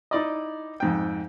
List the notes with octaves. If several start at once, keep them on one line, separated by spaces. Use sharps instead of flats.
D#4 E4 D5 D#5
F2 G#2 G5